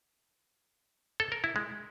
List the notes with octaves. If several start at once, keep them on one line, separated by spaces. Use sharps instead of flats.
A4
A#4
E4
G#3